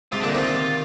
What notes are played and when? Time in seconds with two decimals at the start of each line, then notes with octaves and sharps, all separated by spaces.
0.12 G#2 C3 F4
0.21 A#2 D3 D4
0.29 D#4
0.34 C3 D#3 F4